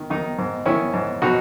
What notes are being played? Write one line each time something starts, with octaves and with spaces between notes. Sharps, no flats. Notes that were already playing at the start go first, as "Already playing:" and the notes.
Already playing: D#3
D#3 D#4
G#2
D#3 C#4 E4
G#2
B2 D#4 F#4